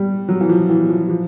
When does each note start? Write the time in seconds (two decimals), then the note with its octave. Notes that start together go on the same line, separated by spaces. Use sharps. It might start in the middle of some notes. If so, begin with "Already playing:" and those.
Already playing: G3
0.28 F#3
0.41 E3
0.49 F3
0.69 E3
0.89 F3
1.10 F3